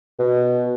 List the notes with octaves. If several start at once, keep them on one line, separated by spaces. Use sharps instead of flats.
B2